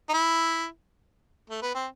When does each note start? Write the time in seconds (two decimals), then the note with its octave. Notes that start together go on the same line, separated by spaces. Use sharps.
0.09 D#4
0.13 E4
1.50 A3
1.62 B3
1.75 C4